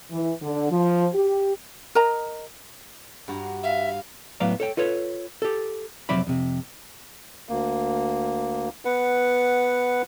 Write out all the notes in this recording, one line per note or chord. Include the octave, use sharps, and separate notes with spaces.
E3
D3
F3
G4
A#4 D#5 A#5
G2 F#4 A#5
E5 F5
A2 F#3 B3 D5 F5 A#5
A4 C#5 G5
F4 A4 B4 C#5
G4 A4
F2 C3 F#3 D5 E5 B5
F2 C3
D2 A#3
B3 B4 F#5